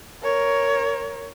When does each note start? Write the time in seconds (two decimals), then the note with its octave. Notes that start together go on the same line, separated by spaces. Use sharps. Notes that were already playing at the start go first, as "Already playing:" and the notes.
0.23 A#4 C#5